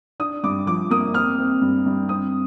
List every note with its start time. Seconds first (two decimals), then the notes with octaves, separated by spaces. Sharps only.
0.20 D4 D#6
0.43 G2 D6
0.66 F3 D6
0.90 A#3 D#6
1.14 C4 F6
1.38 C4
1.61 G2
1.86 G2
2.09 C4 D#6